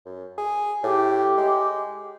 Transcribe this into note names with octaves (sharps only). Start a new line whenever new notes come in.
F#2
G#4
A2 G4
G#3